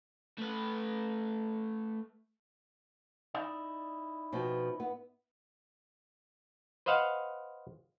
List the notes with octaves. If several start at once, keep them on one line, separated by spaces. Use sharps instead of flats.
A3 B4
D#4 E4 D5
B2 F3 C4
B3
B4 C5 D#5 F5 F#5